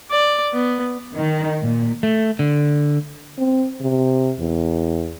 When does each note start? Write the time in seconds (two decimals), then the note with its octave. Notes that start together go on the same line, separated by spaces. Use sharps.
0.11 D5
0.53 B3
1.16 D#3
1.63 A#2
2.03 A3
2.39 D3
3.38 C4
3.81 C3
4.40 E2